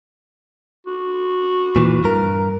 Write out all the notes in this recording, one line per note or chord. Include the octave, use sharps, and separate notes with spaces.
F#4
A#2 E3
G2 A#4